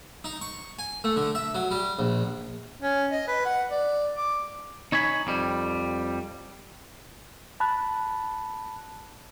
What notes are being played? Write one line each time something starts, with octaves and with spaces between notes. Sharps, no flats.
D#4
C#6
G#5
A3
D3
E5
F#3
G3
A#1
C#4
D#5
B4
F#5
D5
D6
D#4 C#5 G#5 B5
F2 G3
A5 B5 F#6